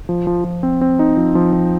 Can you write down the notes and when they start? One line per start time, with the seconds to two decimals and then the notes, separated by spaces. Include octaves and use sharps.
0.09 F3
0.27 F3
0.44 F3
0.63 C4
0.81 C4
0.99 D#4
1.17 F3
1.35 F3
1.53 F3